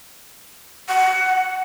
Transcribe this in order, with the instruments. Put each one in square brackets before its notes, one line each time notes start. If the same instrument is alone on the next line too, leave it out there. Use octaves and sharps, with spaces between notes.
[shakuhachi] F#5